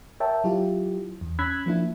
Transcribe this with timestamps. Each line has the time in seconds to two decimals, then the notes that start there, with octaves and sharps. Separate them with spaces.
0.20 A#4 C#5 E5 G5 A5
0.44 F#3 E4 F4 G4
1.21 E2
1.39 C#4 B5 E6 F#6 G#6 B6
1.66 F3 A#3 D4 E4